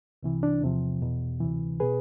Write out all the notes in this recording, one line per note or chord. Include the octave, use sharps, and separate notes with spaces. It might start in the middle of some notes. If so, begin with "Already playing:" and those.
C2 C3 E3
D4
E2 C3 F3
E2 B2
D2 C3 E3
B2 G#4 B4